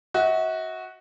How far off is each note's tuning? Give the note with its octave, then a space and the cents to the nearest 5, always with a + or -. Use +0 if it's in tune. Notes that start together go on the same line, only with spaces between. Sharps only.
F#4 +0 E5 -45